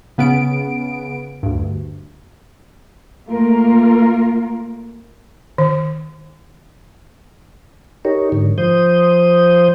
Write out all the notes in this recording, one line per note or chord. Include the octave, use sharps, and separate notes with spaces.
C#3 B3 C#4 D7
D2 G2
A3 A#3 F4 A#4
D#3
D#4 G4 A#4 C#5
G#2 D3
F3 C5 D#6 G6